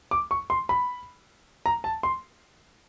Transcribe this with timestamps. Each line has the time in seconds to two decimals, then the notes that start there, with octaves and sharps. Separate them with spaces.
0.11 D6
0.31 C#6
0.50 C6
0.69 B5
1.66 A#5
1.84 A5
2.03 C6